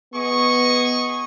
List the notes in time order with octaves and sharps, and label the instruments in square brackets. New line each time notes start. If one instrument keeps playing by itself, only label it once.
[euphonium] B3 [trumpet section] G#4 D#5 C#6